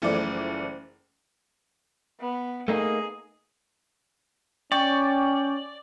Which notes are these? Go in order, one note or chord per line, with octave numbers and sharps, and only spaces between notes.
F#1 E3 F3 A3 D5 D6
B3
A3 A#3 D#4 G#4
C#4 D5 G5 C#6